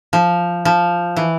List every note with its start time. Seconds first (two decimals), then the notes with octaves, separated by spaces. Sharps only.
0.13 F3
0.65 F3
1.16 E3